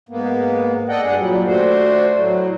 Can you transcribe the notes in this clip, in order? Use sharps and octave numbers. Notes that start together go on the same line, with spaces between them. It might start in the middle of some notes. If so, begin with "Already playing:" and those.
G#2 A#3 B3
A4 D5 D#5 F#5 G5
G2 D4 G#4 F#5
A#2 F#3 G3
A3 D4 F#4 C5
A2 F#3